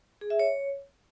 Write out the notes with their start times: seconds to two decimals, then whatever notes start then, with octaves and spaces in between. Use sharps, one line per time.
0.21 G#4
0.30 E5
0.39 C#5